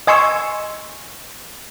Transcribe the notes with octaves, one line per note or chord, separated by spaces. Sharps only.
D#5 G#5 C6 C#6 E6